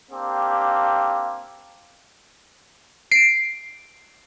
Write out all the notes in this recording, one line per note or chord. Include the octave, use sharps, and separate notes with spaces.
A#3 C4 D4 G4 F5
C7 D7